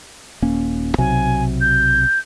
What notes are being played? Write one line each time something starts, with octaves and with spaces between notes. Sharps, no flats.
D#1 A#3 C#4
B1 C3 F#3 G#5
G6